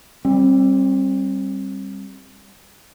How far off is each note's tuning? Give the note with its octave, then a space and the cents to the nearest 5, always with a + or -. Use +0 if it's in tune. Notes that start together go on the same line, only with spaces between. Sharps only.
G3 +0 C4 +35